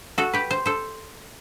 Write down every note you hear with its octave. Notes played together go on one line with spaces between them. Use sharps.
F#4 A4
G4 B4
C5
A4 C5